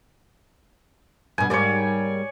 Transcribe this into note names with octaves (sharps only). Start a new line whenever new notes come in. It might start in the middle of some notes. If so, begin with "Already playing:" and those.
G2 B2 G#5
G#2 G3 A#3 C#5 D5